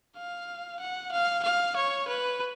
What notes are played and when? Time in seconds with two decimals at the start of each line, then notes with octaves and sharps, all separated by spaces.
0.16 F5
0.80 F#5
1.12 F5
1.44 F5
1.76 C#5
2.08 B4